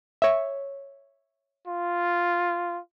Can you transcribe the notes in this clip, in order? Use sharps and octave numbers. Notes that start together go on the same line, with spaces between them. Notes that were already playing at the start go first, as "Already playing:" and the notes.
C#5 E5
F4